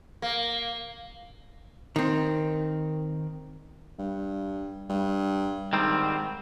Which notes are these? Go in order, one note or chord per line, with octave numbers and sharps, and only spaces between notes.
A#3
D#3 C4
G2
G2
G#2 D#3 G3 C4